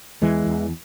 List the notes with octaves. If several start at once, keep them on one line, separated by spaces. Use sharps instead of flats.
E2 E3 G#3
E2